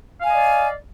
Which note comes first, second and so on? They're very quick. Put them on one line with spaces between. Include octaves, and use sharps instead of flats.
F5 G#5 D#5 D5